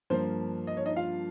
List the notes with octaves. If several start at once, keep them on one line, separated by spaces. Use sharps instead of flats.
G2 F3 A#3 C5
D#5
C#5
D#4 D#5
F4 F5